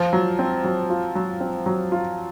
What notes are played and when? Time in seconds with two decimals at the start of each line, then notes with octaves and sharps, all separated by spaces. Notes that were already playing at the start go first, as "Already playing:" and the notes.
Already playing: F3 F4
0.13 F#3
0.39 C4
0.64 F#3
0.90 F4
1.15 F#3
1.40 C4
1.66 F#3
1.92 F4